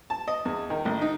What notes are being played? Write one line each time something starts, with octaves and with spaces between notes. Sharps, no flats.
A5
D#5
E2
D#3
A1
D#4